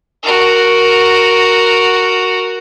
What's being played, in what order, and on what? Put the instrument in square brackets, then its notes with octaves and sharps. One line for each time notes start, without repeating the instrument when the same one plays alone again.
[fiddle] F#4 A#4